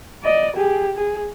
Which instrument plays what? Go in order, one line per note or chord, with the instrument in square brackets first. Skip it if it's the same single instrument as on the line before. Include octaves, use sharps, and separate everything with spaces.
[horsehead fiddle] D5 D#5
G4 G#4
G#4